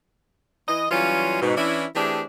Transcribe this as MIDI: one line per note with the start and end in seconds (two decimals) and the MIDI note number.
0.68 0.86 52
0.68 0.86 75
0.91 1.39 52
0.91 1.39 54
0.91 1.39 55
0.91 1.39 61
0.91 1.39 65
1.41 1.56 44
1.41 1.56 47
1.56 1.85 52
1.56 1.85 61
1.56 1.85 62
1.56 1.85 64
1.95 2.22 52
1.95 2.22 57
1.95 2.22 60
1.95 2.22 62
1.95 2.22 67
1.95 2.22 68